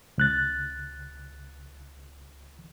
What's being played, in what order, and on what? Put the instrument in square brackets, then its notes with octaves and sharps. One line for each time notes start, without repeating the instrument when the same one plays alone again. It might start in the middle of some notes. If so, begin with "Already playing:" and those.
[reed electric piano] C#2 F#6 A6